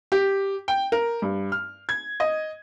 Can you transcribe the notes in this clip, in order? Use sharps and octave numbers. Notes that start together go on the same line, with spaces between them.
G4
G5
A#4
G2
F6
G#6
D#5